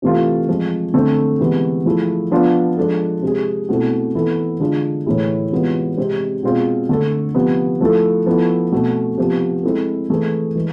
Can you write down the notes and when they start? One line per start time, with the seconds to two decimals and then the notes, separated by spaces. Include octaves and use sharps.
0.02 C3 E3 A3 C4 F4
0.48 F3 G#3 C4
0.94 D3 A3 C4
1.40 C3 E3 G#3 B3
1.86 F3 A3 E4 G#4
2.31 F3 B3 D4 F4
2.77 F3 G#3 D4 A4
3.22 C3 G#3 C4 G#4
3.69 B2 A3 C4 E4 A4
4.15 E3 B3 E4 A4
4.60 D3 G#3 D4 F4 G#4
5.06 A2 E3 A3 E4 G#4
5.52 C3 E3 G#3 B3 F4
5.97 C3 G#3 C4
6.43 B2 G#3 C4 F4 G#4
6.89 D3 A3 D4 A4
7.35 C3 F3 B3
7.81 F3 A3 E4 A4
8.26 F3 B3 E4 A4
8.72 B2 A3 C4
9.18 C3 F3 B3
9.63 G#3 C4 E4 A4
10.10 E3 A3 C4 G#4
10.55 E3 G#3